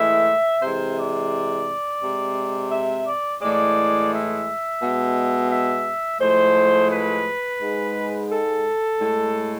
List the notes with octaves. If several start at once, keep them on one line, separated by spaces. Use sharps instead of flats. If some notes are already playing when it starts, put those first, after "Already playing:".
Already playing: A2 E3 G#3 E5
C3 E3 G#3 C5
D5
C3 G#3
E5
D5
A2 E3 G#3 D5
E5
B2 G#3
E5
A2 F3 G#3 C5
B4
G#2 G#3
A4
A2 G#3